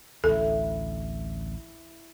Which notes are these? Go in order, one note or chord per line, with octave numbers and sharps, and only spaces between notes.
A1 D2 E4 A4